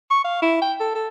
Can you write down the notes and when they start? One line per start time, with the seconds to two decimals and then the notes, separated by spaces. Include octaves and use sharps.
0.11 C#6
0.24 F5
0.42 E4
0.62 G5
0.80 A4
0.95 A4